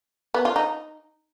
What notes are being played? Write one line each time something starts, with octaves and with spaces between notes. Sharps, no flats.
B3
F4
D#4